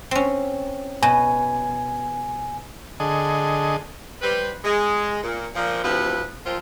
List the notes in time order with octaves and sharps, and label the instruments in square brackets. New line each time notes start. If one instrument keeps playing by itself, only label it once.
[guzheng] C4 C#4
[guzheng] B2 [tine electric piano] G#5
[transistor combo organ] D3 G#4 A4 D#5
[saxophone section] G3 B4 C5
G#3
A#2
A#2 F3
D2 C3 F3 B3 E4 B4
A#2 F3 C4 F4